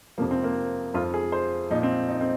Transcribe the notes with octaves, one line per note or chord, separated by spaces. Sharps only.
F2 C3 F3 A#3
C4
A#3
F2 F3 F4
G#4
C5
A#2 F3 D#4
C4
D#4
C4